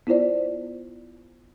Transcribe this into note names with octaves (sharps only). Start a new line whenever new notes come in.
B3 E4 F4 C5 D5